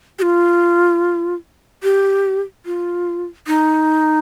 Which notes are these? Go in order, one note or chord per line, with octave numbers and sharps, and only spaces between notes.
G4
F4
G4
F4
D#4